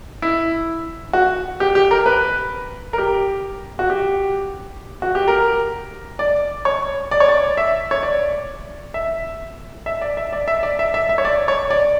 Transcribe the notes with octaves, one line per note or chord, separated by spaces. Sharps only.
E4
F#4
G4
G4
A#4
B4
A#4
G4
F#4
G4
F#4
G4
A#4
D5
C#5
D5
C#5
D5
E5
C#5
D5
E5
E5
D5
E5
D5
E5
D5
E5
E5
E5
C#5
D5
C#5
D5